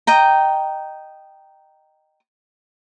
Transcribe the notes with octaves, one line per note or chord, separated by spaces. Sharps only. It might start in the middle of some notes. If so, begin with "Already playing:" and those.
D#5 G5 A#5